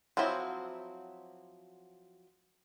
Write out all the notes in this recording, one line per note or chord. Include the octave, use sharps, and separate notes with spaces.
F3 F#3 C4 E4 F#4